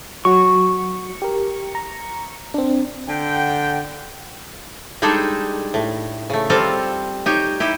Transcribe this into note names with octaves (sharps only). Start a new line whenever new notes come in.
F#3 F#4 C#6
G4 A#4
A#5
C4 D4
D3 G5
G3 G#3 D4 D#4 G#4 A4
A2
C#3 A3
G3 C4 F4 A4 F5 A#5
D#4 G4 C#5
D#4 E4 G4